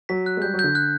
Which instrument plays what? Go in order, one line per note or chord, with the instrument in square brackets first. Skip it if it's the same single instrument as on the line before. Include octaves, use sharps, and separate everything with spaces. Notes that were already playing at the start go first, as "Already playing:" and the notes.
[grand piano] F#3 [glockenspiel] B6
[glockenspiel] F#6
[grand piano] G#3
[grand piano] G3 [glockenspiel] G6
[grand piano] F#3
[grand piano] D3 [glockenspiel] G6
[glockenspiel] F#6